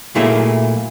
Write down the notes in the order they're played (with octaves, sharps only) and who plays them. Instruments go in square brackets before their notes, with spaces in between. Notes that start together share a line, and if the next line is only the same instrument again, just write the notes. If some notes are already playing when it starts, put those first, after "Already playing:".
[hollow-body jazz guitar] A#2 F#3 A3 A#3 E4 G#4